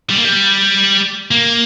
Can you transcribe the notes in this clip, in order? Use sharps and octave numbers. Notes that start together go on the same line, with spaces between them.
G3
A#3
G3
A#3